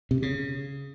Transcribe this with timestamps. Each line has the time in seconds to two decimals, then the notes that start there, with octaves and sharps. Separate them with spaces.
0.11 C3
0.22 C#3